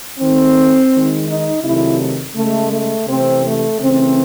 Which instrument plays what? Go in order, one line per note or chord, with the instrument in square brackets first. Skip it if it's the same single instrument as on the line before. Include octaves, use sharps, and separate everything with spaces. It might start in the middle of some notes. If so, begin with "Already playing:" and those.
[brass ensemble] D#3 A3 C4
D#3 G#3
D#4
C3 D#3 F#3 A3 E4
C#3 G#3 A3
A3
C3 E3 A3 C4
A3
C#3 E3 A3 C4